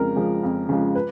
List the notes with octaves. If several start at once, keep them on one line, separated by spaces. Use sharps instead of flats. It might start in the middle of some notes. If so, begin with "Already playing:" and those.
Already playing: F2 C#3 F3 G#3 A#4
C#3 F3 G#3
F2
C#3 F3 G#3
B4